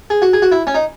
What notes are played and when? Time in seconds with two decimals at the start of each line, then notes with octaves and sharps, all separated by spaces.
0.10 G#4
0.22 F#4
0.33 G#4
0.42 F#4
0.52 E4
0.67 C#4
0.75 D#4